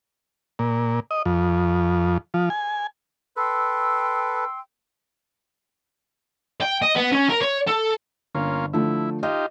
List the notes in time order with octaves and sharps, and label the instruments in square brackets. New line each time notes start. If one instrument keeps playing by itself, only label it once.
[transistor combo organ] A#2
D#5
F2
F3
G#5
[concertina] A4 B4 [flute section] G5 C6 E6
[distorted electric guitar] G5
D#5
B3
C#4
A#4
C#5
A4
[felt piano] G1 [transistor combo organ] A#3 C#4 F4
[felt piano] D3 F3 A3 [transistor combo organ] E4
[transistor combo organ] D#4 F4 G4 [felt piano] D#5